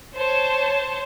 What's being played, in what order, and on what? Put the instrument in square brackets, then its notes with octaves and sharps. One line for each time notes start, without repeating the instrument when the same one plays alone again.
[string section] C5 C#5 A5